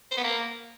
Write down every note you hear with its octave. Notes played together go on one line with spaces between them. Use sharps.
C5
B3
A#3